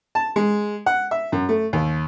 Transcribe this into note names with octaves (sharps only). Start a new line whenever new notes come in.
A5
G#3
F#5
E5
F#2
A3
D#2